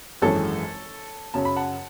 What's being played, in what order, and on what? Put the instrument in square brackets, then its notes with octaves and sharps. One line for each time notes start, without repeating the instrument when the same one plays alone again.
[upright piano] G#1 F#2 E3 G#3 A4 C#5
F#2 C#3 F#3 C#4 A5
B5
F#5 A5